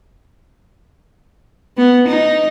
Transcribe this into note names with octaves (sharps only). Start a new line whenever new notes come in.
B3
D#4